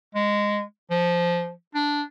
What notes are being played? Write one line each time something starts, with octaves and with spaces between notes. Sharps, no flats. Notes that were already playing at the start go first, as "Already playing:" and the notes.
G#3
F3
D4